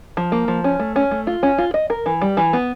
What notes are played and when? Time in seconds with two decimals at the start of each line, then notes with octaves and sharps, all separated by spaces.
0.17 F3
0.32 A#3
0.48 F3
0.64 C#4
0.79 A3
0.96 C#4
1.11 A3
1.27 F4
1.43 C#4
1.58 F4
1.74 D#5
1.90 A#4
2.06 E3
2.21 G3
2.37 E3
2.53 B3